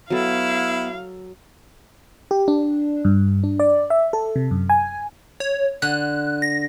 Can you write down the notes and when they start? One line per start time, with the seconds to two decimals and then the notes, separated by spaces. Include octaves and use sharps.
0.10 F#3 B3 E4 A4 F5
2.31 G4
2.48 D4
3.05 G2
3.43 D4
3.60 D5
3.90 E5
4.13 A4
4.36 C3
4.51 F#2
4.70 G#5
5.40 C#5
5.82 D3 F#6
6.42 A#6